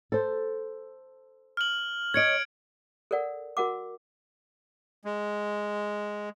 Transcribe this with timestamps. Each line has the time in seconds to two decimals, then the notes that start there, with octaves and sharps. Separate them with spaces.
0.12 A4 C5
1.57 F6 F#7
2.14 C#5 D#5 G#6 C#7 D7
3.11 A4 A#4 D5 F#5
3.57 F#4 A#4 F#5 D6
5.05 G#3